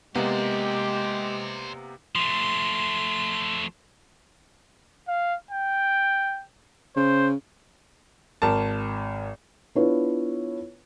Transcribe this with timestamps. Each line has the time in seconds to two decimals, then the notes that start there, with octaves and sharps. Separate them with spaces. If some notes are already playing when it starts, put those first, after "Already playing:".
0.15 C3 G#3 A#3 B3 G4 C5 D5
2.15 F3 A3 C6
5.08 F5
5.51 G5
6.96 C#3 C5
8.42 G#1 A#4 A5
9.75 B3 D4 E4 F4 B4 C#5